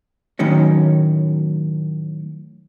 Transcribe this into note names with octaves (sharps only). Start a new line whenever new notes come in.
A2 D#3 F#3 C#4